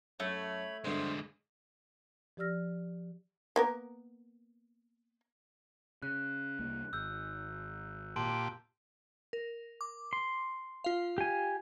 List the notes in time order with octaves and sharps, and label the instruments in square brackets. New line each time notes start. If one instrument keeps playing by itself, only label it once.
[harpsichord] F#2 [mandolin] A3 [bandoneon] C#5 B5
[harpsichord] G2 B2 [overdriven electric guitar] D3 G#3 [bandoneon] C5
[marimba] F3 G4 D5 E6 F6 A#6
[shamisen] A#3 B3 A#4
[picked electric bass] C#3 [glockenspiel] F#6
[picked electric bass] C2 A#3
[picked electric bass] G#1 [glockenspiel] E6 G6
[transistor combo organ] A#2 G4 [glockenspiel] A5 C6 D7
[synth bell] A#4
D6
[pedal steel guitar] C6
[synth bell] F4 F5
[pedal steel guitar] G4 G#5